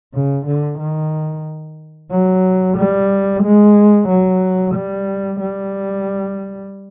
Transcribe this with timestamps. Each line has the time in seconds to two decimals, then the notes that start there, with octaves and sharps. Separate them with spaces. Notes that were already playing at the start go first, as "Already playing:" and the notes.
0.14 C#3
0.46 D3
0.79 D#3
2.10 F#3
2.77 G3
3.43 G#3
4.08 F#3
4.74 G3
5.40 G3